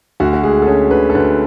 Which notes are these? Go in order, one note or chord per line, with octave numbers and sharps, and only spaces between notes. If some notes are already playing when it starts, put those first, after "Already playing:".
D2 F#4
F#4
G#3 G#4
A4
C#4 G#4
D3 B4
A4
D2 B4